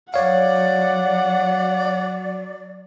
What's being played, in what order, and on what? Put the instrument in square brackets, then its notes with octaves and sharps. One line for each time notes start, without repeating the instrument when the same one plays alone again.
[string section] F#3 [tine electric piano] C#5 F5 [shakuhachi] D5 [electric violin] F#5